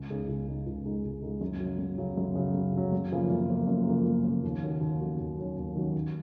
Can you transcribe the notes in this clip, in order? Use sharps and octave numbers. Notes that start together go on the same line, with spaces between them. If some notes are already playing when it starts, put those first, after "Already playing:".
Already playing: C#2
C#3 G#3 D#4
C#2
C#3 G#3 D#4
C#2
C#3 G#3 D#4
C#2
C#3 G#3 D#4
F#2
C#3 F#3
F#2
C#3 F#3
F#2
C#3 F#3
F#2
C#3 F#3
F#2
C#3 F3 A#3 F4
F#2
C#3 F3 A#3 F4
F#2
C#3 F3 A#3 F4
F#2
C#3 F3 A#3 F4
D#2
D#3 F#3 C#4 F#4
D#2
D#3 F#3 C#4 F#4
D#2
D#3 F#3 C#4 F#4
D#2
D#3 F#3 C#4 F#4
D#2